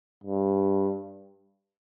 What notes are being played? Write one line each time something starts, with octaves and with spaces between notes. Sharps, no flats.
G2